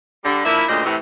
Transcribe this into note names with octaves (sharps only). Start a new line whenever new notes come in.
D3 G3
F3 A#3 D4 E4
D2 A#2 C#3 C5 D5 D#5
A2 C3 E3